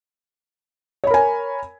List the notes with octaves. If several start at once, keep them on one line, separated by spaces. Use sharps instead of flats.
A#4 C#5 G#5 B5